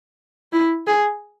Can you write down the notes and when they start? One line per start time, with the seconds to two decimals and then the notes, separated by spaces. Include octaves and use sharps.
0.53 E4
0.87 G#4